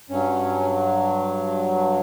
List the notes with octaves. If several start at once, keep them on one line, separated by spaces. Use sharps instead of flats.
G2 F#3 C#4